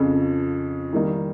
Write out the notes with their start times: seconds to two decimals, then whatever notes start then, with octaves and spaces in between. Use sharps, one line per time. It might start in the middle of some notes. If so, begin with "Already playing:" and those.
Already playing: F2 C#3 F3
0.93 D#3 G3 A#3 D#4